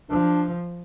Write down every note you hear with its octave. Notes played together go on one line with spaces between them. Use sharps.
F3 D4